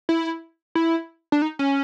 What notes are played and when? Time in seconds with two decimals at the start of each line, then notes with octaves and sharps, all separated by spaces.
0.09 E4
0.75 E4
1.32 D4
1.42 D#4
1.59 C#4